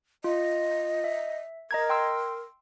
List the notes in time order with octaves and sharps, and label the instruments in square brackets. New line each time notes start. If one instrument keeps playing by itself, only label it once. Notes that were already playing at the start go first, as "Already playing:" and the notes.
[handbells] F4 [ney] D#5
[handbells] E5
[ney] A#4 [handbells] D#5 A#5 G#6
[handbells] G5 C6 E6